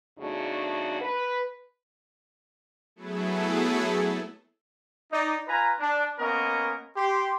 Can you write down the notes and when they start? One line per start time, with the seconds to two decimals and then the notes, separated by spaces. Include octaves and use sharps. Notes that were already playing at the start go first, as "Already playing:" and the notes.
0.19 E2 C#3 A3 D4 D#4 F#4
1.02 B4
2.96 F#3 A3 B3 E4 G#4 A4
5.11 D#4 D5
5.48 F4 B4 G#5 A#5
5.79 D4
6.19 A#3 B3 C#4 A#4 D#5 C#6
6.95 G4 C6